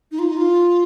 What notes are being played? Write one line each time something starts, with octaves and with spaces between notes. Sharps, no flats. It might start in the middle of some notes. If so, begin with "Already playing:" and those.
D#4
F4
D#4
F4